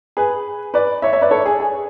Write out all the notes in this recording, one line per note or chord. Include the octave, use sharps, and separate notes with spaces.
G#4 B4
B4 D5
C#5 E5
C#5 E5
B4 D5
A4 C#5
G#4
G#4